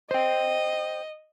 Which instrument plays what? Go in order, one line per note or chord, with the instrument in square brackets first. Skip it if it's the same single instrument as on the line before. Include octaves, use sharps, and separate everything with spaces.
[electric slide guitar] C5 G5 [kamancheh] D#5